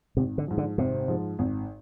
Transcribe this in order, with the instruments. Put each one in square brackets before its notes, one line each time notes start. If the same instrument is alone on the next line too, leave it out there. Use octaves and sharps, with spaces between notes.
[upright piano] G#1 [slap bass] C3
[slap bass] D3
[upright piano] G#2 F3
[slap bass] D3
[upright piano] G#1 [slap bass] C3
[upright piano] G#2 F3
G#1